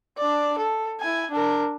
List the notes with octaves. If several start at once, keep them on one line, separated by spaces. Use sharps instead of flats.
D4 D5
A4
E4 G#5
D4 A#4